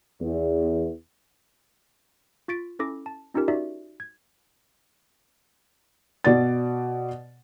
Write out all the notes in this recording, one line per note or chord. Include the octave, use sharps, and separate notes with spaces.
E2
F4 C#6 A6 B6 D7
C#4 E4 A4 D6 A#6
A5
C#4 D#4 F4 G4 A#4
D#4 F#4 D5 E5
G#6
B2 D5 A6